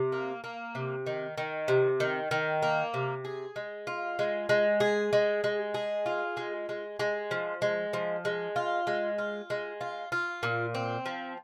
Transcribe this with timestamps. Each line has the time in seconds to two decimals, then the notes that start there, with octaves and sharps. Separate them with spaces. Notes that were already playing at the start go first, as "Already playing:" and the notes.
Already playing: C3
0.12 A#3
0.44 A#3
0.75 C3
1.07 D#3
1.38 D#3
1.68 C3
2.00 D#3
2.31 D#3
2.62 A#3
2.94 C3
3.25 G#4
3.56 G#3
3.87 F4
4.19 G#3
4.49 G#3
4.80 G#4
5.13 G#3
5.44 G#3
5.74 G#4
6.06 F4
6.37 G#3
6.69 G#3
7.00 G#3
7.31 F3
7.62 G#3
7.93 F3
8.25 G#3
8.56 F4
8.87 G#3
9.18 F4
9.50 G#3
9.81 F4
10.12 F4
10.43 A#2
10.75 C4
11.06 F3